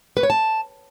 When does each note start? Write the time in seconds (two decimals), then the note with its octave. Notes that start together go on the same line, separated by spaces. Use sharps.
0.17 B4
0.23 C#5
0.30 A5